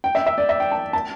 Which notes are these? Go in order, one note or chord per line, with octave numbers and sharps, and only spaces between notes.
G5
E5
E5
D5
E5
G5
A5
A5